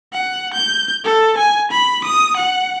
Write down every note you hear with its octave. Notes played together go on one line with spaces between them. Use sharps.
F#5
G6
A4
G#5
B5
D#6
F#5